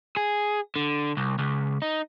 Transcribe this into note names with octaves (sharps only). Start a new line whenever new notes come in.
G#4
D3
C2
C#2
D#4